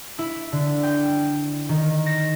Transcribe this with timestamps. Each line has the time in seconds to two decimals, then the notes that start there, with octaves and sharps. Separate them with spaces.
0.19 E4
0.52 D3
0.83 G5
1.69 D#3
2.06 A#6